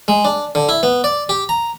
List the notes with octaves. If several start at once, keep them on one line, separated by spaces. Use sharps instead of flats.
G#3
D4
D3
E4
B3
D5
G4
A#5